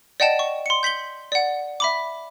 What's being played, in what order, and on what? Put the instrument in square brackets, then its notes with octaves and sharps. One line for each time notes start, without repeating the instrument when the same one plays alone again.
[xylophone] D5 D#5 F#5 G5 A5 E7
C#6
C6 C#7
G6 B6 F#7 G7
D5 F#5
E5 B5 D6